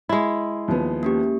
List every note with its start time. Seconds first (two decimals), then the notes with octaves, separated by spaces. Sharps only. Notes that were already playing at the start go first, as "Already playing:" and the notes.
0.09 G#3 E4
0.68 D#2 F3 B3
1.03 A#3 C#4 G4